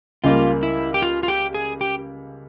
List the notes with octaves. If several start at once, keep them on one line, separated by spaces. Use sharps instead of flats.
C#2 C#3 G3 A#3 F4
E4
G4
F4
F4
G4
G#4
G4